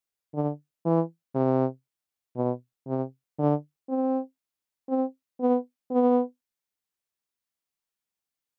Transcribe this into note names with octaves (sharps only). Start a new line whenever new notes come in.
D3
E3
C3
B2
C3
D3
C4
C4
B3
B3